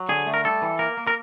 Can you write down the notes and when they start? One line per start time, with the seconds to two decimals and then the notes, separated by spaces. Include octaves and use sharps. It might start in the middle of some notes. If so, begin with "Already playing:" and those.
Already playing: F#3
0.09 D3 G#4
0.26 A3
0.34 A#4
0.44 G3 A4
0.62 E3
0.79 A#3 A#4
0.97 A#3
1.07 A#4